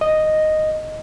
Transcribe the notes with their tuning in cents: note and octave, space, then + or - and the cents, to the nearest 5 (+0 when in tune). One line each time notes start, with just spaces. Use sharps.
D#5 -5